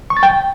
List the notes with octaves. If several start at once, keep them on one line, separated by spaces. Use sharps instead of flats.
C#6
A6
G5